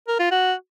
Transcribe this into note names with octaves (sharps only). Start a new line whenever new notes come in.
A#4
F4
F#4